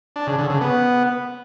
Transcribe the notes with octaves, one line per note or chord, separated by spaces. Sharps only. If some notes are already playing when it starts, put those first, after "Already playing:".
D4
C#3
D3
C#3
B3